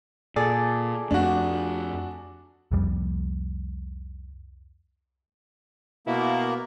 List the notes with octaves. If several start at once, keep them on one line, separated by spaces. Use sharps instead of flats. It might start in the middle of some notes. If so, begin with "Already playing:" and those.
A#2 G#4 A4 D5
F2 A3 D4 F#4
C2 F2 G3
B2 A#3 E4